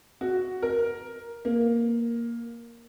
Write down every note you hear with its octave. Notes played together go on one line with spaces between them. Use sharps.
F#4
A#4
A#3